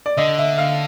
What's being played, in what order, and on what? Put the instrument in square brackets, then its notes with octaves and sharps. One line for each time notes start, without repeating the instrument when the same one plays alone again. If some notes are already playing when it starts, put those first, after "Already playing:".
[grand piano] D5
[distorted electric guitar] D3 [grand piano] D#5
[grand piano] E5
F5